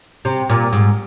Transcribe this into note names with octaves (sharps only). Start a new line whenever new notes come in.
C3
A#2
G#2